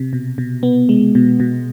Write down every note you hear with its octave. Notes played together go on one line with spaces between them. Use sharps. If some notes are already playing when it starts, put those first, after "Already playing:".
Already playing: C3
B2
B2
B3
G#3
B2
B2